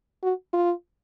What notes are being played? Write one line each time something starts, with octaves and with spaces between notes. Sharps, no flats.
F#4
F4